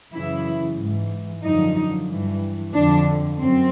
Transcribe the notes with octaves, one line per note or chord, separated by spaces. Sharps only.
F#2 C#3 E3 E4
G#2 E3
F#2 D3 F3 D#4
G2 E3
F2 D3 F3 D4
F#2 C4